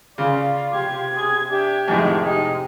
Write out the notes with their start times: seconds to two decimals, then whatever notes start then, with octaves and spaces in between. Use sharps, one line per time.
0.18 C#3 F4 D5
0.73 C3 G4 G#6
1.16 G#4
1.49 D4 G4 E5
1.88 F2 A2 D#3 G#3 F#4
2.21 C3 D#4 G#4